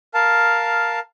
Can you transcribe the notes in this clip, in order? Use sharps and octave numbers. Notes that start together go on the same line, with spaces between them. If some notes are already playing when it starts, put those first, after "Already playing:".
A#4 F5 A5